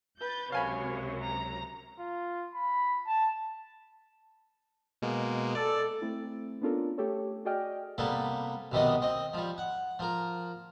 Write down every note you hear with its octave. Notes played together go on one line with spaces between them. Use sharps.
B4 G6 A6
C#2 F#2 C3 C#5 F5 G#5 B5
A#5
F4
B5
A5
B2 G#3 A#3
A4 D5
A3 C4 E4
B3 C#4 D4 F4 A4 A#4
A3 G4 A4 C#5
F#4 G#4 D5 D#5 G5 F6
C3 G3 A#3 B3 A4
B1 C3 D#3 G3 B3 D#5
C4 D#5
F3 G3
F#5
F3 A#4